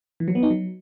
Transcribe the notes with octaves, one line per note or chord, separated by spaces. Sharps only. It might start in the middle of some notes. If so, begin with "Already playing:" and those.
E3
F#3
B3
D#4
F#3